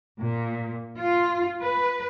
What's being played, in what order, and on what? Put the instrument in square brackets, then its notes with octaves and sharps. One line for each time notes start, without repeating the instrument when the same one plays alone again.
[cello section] A#2
F4
B4